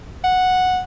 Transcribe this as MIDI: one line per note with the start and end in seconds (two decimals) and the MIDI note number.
0.24 0.80 78